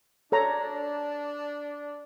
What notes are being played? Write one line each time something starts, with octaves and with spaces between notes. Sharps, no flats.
D4 A4 C#5 A#5